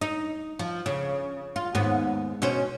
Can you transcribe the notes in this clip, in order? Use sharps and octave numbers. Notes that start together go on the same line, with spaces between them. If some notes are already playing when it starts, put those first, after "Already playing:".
D#4
F3
C#3
F4
D#2 G#2 B3
B2 C#4 C5